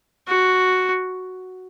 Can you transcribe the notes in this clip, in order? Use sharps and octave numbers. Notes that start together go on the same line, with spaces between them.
F#4